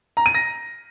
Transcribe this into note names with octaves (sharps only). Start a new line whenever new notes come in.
A#5
D#7
A#6